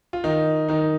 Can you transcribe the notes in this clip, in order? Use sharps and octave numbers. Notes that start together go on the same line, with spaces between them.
F4
D#3 D#4
D#3 D#4